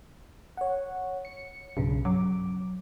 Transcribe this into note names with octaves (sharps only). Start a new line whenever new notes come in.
C#5 F#5
C#7
B1 G2 C#3
F#3 D6